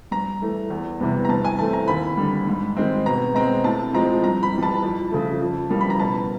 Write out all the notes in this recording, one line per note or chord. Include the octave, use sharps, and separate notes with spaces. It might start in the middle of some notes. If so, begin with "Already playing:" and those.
G2 A#5
E3 A3
E2
C3 E3 G3 B3
A#5
G2 A5
G#5
E3 A3 C4 A5
A#5
D#2 B5
D3 G3
G#2
D#3 G#3 C4
B2 A#5
G#3 C4 A#5
A2 A5
F3 G#3 C4 A#5
G2 A#5
B5
E3 G3
A5
F2
C#3 F3 A3
F2
C#3 E3 G3 A#3
B5
A#5
B2 A5